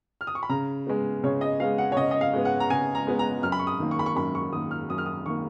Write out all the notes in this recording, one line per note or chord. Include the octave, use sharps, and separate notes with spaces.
F6
D#6
C#6
B5
C#3 A#5
G#3 B3
C#3 C#5
D#5
G#3 B3 F5
F#5
C#5
C#3 D#5
D#5
F5
G#3 B3
F#5
A#5
C#3 G#5
A#5
G#3 B3
A#5
F#2 F6
B5
C#6
D#6
D#3 A#3
C#6
B5
C#6
F#2 B5
C#6
D#3 A#3 D#6
F6
F#2 D#6
F6
D#6
D#3 A#3 C#6